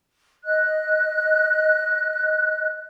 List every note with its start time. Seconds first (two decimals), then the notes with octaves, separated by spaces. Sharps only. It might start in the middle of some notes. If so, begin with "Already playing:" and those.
0.45 D#5 F#6